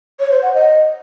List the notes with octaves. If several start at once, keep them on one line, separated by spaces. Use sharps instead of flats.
C#5
C5
F#5
D#5